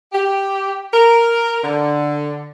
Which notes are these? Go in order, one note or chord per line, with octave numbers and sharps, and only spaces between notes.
G4
A#4
D3